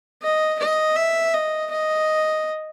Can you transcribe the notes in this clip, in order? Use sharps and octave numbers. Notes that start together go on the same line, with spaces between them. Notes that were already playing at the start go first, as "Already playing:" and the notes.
D#5
D#5
E5
D#5
D#5